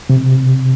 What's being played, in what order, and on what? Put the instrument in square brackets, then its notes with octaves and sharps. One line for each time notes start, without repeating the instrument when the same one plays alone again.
[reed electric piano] C3